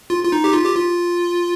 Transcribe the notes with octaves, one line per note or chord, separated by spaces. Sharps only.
F4
F4
D#4
G4
F4
G4
F4